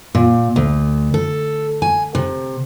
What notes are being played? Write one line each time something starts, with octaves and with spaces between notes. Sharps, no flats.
A#2
D2
A4
G#5
C3